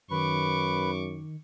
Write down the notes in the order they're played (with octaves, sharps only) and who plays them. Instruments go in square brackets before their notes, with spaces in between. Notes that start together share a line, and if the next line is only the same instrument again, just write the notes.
[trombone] F#2 [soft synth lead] D#3 [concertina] B4 [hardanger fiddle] C#6 D6